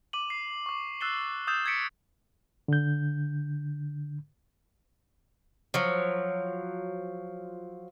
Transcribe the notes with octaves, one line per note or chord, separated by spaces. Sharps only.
D6 D#7 F#7
C7
C#6 D6
E6 F#6 A6 C7 E7 G7
D#6 E6 G6 A6 E7
G#6 A6 B6 C#7 D7
D3 G6
F3 F#3